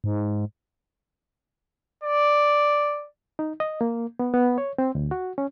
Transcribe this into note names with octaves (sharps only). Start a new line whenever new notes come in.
G#2
D5
D#4
D#5
A#3
B3
B3
C#5
C4
D2
F#4
C#4